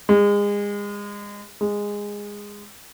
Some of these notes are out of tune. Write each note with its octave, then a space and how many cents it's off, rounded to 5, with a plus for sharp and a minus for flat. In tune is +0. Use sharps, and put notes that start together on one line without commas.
G#3 -30
G#3 -15